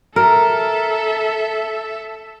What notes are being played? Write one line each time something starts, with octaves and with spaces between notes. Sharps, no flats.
A4 A#4 E5